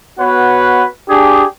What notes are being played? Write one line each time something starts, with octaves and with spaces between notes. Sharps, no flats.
B3 F#4 B4 C#5 F#5
D4 G4 G#4